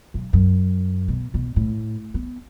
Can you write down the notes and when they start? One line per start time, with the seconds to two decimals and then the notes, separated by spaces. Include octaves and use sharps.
0.14 B1
0.33 F#2
1.08 B2
1.34 B2
1.56 A2
2.14 B3